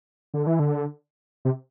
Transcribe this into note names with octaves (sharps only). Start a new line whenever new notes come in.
D3
E3
D3
C3